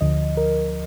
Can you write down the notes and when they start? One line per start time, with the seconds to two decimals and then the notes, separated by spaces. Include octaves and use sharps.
0.01 D2 D3 F3 D#5
0.37 A#4